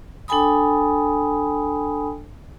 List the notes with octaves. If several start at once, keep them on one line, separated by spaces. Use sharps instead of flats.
D4 A4 G5 G#5 B5 D#6